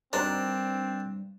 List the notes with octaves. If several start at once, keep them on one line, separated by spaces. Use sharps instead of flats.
G2 D#3 C4 D4 F#4 C5 A#5